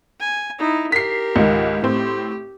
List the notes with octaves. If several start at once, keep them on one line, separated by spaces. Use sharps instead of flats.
G#5
D#4 E4
G4 A#4 B6 C7
C#2 G#2 D#3
A2 C4 G4